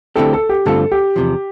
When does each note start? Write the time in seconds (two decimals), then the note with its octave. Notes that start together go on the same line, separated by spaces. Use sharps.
0.16 D3 A3 C4 E4 G4 A4
0.33 A4
0.49 G4
0.66 G2 D3 A3 C4 F4 A4
0.92 G4
1.16 E2 C3 F3